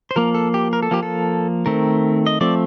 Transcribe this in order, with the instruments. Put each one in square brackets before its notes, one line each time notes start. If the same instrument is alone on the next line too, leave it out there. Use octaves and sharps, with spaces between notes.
[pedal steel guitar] C5
F3 A#3 A#4
A4
G4
A#4
A4
F3 A#3 G4
A4
D#3 A3 C4 A#4
D#5
F3 A3 C4 D5